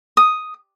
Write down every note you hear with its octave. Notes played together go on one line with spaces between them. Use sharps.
D#6